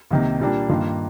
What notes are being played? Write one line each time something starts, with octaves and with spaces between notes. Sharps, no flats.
C2 C3 D#3 A#3
A#2 G3 A#3 D4
G2 D#3 A#3 F4